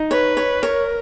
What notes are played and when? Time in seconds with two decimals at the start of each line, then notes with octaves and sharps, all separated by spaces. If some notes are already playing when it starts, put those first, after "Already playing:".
Already playing: D#4
0.11 B4 C#5
0.37 C#5
0.62 A#4 C#5